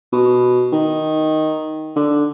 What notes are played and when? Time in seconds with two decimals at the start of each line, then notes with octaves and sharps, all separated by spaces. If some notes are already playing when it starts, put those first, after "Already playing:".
0.12 B2
0.72 D#3
1.96 D3